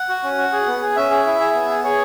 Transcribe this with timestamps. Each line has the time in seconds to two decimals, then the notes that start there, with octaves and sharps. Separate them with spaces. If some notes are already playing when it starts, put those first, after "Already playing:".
Already playing: F#5
0.09 F#4
0.24 C#4
0.37 F#4
0.52 G#4
0.67 B3
0.81 G#4
0.96 C#4 E5
1.11 G#4
1.26 E4
1.40 G#4
1.55 B3
1.70 G#4
1.84 G#4 C#5